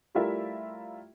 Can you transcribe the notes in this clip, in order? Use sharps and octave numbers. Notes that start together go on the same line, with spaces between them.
G3 A3 E4 F4 A#4 E5